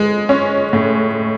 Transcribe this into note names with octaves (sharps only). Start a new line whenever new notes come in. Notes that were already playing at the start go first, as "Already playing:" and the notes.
Already playing: G#3
C#4
A2